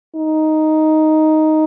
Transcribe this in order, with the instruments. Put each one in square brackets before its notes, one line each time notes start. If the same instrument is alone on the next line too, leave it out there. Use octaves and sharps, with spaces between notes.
[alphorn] D#4